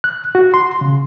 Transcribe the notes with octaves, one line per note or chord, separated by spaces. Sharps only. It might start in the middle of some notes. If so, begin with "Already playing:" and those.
F#6
F#4
C6
C#3